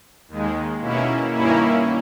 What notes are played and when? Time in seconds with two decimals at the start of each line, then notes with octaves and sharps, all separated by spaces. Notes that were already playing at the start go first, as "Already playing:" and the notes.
0.28 D#2 D#3 G#3
0.80 B2 A#3 C#4 E4
1.32 G2 D#3 A#3 C#4 E4